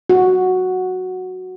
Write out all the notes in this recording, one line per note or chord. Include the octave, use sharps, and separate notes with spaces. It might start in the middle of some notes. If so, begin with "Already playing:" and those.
F#4